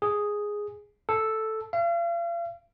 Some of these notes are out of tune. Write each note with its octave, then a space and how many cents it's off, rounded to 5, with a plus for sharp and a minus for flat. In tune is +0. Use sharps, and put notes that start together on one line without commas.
G#4 +0
A4 +0
F5 -40